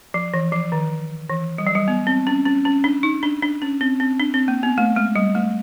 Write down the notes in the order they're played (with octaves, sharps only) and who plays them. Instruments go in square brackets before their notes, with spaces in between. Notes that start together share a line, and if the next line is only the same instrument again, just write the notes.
[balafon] F3
E3
F3
D#3
E3
G3
F#3
G3
B3
C4
C#4
C#4
C#4
D4
D#4
D4
D4
C#4
C4
C4
D4
C4
A#3
B3
A3
G#3
G3
A3